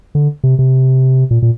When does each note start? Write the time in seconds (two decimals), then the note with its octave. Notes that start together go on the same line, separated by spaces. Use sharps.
0.15 D3
0.44 C3
0.59 C3
1.31 A#2
1.42 A#2